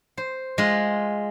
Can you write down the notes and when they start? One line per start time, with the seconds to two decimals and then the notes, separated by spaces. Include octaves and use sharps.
0.17 C5
0.58 G#3 F4